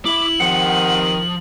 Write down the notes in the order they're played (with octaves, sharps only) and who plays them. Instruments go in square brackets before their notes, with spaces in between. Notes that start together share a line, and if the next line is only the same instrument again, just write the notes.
[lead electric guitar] E4 E5 [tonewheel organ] D6 [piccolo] F#7
[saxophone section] C3 D#3 [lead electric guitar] F3 [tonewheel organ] F#5